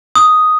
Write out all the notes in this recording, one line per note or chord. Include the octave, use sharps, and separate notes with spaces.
D#6